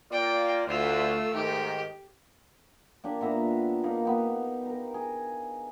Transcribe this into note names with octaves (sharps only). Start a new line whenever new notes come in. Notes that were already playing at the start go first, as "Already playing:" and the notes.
A#3 F4 D5 G5
D2 A3 F4 E6
G#2 D#3 G4
A#3 D4 G4
A#2 B3 E5 A#5
A#3 D#4 F5
B3 G4
A#4 A#5
G#4